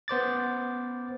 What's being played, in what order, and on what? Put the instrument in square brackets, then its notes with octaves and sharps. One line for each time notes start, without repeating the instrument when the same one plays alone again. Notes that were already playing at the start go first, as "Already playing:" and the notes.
[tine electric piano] B3 C5 D6 A6